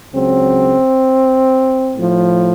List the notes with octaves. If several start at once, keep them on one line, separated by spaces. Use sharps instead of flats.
C#2 C#3 F#3 C4
A2 F3